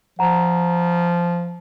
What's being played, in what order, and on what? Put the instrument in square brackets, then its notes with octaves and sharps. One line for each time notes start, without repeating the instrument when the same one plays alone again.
[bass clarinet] F3 [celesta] F#5 A#5